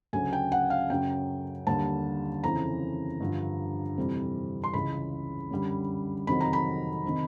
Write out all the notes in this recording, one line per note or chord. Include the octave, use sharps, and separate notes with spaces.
D2 C#3 F#3 G#5
G5
F#5
F5
F#2 C#3 F#3 G5
D#2 D3 G3 A5
F2 C#3 E3 A#5
G2 D3 F3
F2 C3 E3 G3
C6
C#2 C#3 E3 B5
F#2 D3 G3
F2 C3 D#3 F#3 B5
A#5
B5
C3 D#3